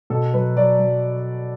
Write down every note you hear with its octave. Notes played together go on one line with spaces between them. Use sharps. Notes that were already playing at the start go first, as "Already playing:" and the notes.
B2 A4
F#3 B4
F#3 D5
F#3